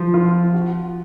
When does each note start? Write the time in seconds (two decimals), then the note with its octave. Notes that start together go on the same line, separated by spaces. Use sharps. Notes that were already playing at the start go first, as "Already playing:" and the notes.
Already playing: F3
0.14 F4
0.54 F#4